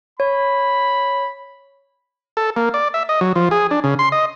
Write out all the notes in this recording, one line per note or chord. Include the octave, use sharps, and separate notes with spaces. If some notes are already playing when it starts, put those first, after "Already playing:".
C#5 B5
A4
A#3
D5
E5
D#5
F#3
F3
G#4
D4
C#3
C6
D#5